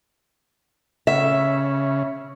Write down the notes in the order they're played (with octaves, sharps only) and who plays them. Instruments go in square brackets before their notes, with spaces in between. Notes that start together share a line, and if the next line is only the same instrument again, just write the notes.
[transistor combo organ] C#3 [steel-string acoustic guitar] E5